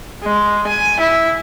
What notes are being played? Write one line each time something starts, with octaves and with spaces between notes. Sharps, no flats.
G#3
G#5
E4